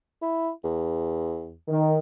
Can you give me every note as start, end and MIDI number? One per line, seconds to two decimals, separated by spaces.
0.22 0.51 64
0.64 1.56 40
1.68 1.97 51